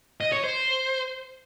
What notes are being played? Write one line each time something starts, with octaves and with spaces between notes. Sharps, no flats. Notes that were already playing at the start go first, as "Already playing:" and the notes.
D#5
C#5
C5